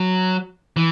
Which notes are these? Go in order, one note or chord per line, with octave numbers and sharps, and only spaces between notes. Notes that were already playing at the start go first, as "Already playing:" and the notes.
Already playing: F#3
E3